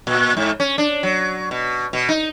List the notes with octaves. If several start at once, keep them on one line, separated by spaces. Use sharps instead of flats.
A#2
G#2
C#4
D4
F#3
B2
B2
D#4